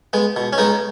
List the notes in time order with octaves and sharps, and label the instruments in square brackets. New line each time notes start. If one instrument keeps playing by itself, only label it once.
[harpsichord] G#3 B3
B2
C#4
G#3 B3 D#4